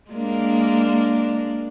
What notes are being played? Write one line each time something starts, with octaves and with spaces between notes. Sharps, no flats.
G#3 A#3 D4